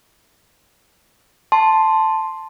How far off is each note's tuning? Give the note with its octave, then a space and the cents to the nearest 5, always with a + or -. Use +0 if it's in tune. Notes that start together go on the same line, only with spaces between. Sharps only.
A5 +0 C6 +0